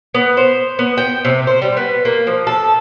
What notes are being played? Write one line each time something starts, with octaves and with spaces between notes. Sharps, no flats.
B3
C5
B3
G5
C3
C5
G3
B3
A#3
F3
A4